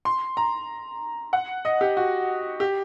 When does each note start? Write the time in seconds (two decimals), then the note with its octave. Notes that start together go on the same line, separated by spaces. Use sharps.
0.05 C6
0.37 A#5
1.33 F#5
1.65 D#5
1.81 G4
1.97 F#4
2.60 G4